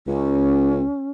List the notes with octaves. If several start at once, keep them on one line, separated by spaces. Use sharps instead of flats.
C#2 C#4